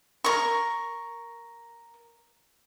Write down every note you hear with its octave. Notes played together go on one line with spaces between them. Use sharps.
A#4 C#6